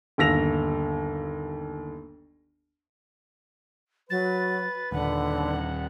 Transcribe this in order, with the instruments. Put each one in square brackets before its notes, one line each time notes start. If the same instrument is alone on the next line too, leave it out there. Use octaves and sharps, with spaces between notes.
[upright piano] G1 D#2 E6 A#6 F7
[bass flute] F#3 [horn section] B4 [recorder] A6
[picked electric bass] D#1 [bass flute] D3 [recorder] F#5